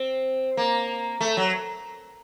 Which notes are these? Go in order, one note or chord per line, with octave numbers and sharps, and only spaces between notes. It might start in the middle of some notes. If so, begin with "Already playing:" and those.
Already playing: C4
A#3
A3
F#3